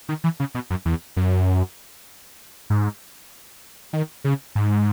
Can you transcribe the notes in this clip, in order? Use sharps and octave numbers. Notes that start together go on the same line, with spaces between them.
D#3
E3
C#3
B2
F#2
E2
F#2
G#2
D#3
C#3
G#2